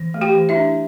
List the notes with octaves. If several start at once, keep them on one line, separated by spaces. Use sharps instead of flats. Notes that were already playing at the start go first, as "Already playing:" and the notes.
Already playing: E3
A3
G4 G5
E3
E4 E5
D4